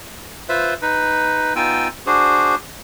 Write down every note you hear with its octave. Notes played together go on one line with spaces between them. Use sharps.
F4 B4 C5 E5
D#4 B4
B3 D#4 F4 G5 G#5 E6
D4 F#4 G#4 C5